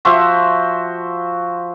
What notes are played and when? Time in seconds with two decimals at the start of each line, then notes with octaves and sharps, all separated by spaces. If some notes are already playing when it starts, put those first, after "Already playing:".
0.05 F3 F#4 C5 E5